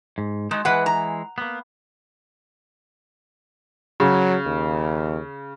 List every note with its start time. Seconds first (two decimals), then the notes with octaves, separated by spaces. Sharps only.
0.18 G#2
0.51 G#3 D#4 F#4
0.65 E3 G#3 B4 F#5
0.86 A#5
1.38 A#3 B3
4.00 C#3 F#3
4.46 D#2